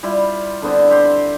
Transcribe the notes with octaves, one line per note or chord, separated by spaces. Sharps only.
G3 E4 F4
D3 B3 C4
G4 C5